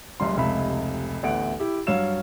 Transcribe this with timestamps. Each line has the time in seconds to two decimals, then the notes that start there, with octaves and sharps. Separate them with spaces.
0.20 F#1 C#2 G3 C6
0.37 F1 C#2 C3 E5 B5
1.23 A1 D2 B3 F#5 D7
1.60 E4 G4
1.87 G2 F#3 C#5 F5 E6 E7